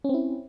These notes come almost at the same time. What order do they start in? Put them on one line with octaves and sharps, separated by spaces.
C#4 C4 E4